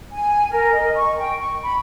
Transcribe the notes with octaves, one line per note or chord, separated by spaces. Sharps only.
G#5
A#4
D#5
C#6
G5
C#6
B5